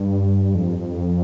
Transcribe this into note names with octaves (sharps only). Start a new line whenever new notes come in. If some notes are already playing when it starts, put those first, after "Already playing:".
Already playing: G2
F2